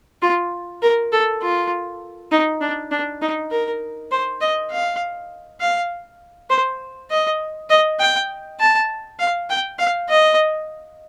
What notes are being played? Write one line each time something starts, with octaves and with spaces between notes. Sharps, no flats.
F4
A#4
A4
F4
D#4
D4
D4
D#4
A#4
C5
D#5
F5
F5
C5
D#5
D#5
G5
A5
F5
G5
F5
D#5